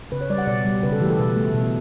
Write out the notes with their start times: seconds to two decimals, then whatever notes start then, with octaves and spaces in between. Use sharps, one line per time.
0.12 C#3 B4
0.21 C#5
0.30 G3 D5
0.38 F#5
0.47 B2 D5
0.65 G3
0.83 C#3 B4
0.92 A4
1.01 E3 A3 G4
1.10 A4
1.19 B2 B4
1.37 A3
1.54 B2